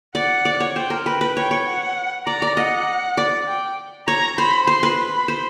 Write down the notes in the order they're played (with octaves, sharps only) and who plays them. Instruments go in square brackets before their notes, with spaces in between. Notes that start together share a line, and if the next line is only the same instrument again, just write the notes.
[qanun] D5 [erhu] F#5
[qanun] D5
C#5
[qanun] C5 [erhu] G5
[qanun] A#4
[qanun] B4 [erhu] G5
[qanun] B4
[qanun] C#5 [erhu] G5
[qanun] C#5
[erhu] F#5
[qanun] D5 [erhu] A#5
[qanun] D5
[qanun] D#5 [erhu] F#5
[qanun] D5
[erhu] G5
[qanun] C#5 [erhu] A#5
[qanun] C5 [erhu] B5
[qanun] C5 [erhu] C6
[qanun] B4
[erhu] B5
[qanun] C5